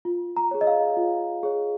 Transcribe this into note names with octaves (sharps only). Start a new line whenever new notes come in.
F4
A#5
G#4 C#5
D#5
F5
F4
G#4 C#5